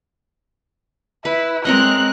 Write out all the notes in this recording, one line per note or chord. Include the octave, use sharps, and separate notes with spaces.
E4 B4
G#3 C4 A#4 C#5 D#5 F#6